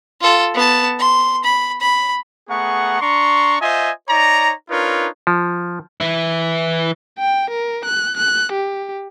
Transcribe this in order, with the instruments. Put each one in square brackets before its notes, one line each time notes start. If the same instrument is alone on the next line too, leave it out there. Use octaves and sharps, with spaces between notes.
[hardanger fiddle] F4 A4
B3 A5
C6
B5
B5
[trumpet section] A3 B3 G#4 F#5 A#5 C#6
D4 A#5 C6 C#6
F4 C5 D#5 E5 G#5
D#4 C#5 D5 A#5
D4 D#4 F4 A#4 B4 C#5
[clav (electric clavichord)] F3
[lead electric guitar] E3 E4
[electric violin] G5
A#4
F#6
F#6
G4